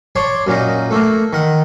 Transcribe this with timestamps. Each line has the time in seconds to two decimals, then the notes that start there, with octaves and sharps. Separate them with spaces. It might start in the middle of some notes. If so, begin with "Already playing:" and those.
0.16 C#5 D5 A5 C6
0.47 F#2 A#2 D#4
0.91 A3 A#3
1.33 D#3 F#5